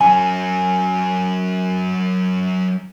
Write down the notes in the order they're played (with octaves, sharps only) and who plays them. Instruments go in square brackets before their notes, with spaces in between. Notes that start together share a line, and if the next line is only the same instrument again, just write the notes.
[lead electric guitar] F#3 C#4 [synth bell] G#5